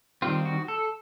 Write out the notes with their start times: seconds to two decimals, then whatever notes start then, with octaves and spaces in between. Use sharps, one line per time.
0.22 D#3 G3 C4 F4
0.45 F#4
0.68 A4